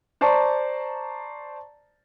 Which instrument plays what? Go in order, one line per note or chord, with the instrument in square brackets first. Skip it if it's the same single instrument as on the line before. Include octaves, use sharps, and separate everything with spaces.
[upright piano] C5 D5 A5 A#5 C#6